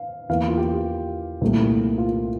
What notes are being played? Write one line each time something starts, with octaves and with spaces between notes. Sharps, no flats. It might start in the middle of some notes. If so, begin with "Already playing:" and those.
Already playing: F5
E2 E3 A#3 F5
F4
G4
C2 A#2 A3
F4